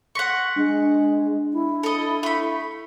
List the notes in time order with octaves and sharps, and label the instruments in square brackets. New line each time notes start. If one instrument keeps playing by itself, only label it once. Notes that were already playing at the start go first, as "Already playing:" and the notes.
[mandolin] F#5 C#6 [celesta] C6 A#6 B6
[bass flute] G#3 [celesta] D4
[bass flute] E4
[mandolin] A4 D#5
A3 B5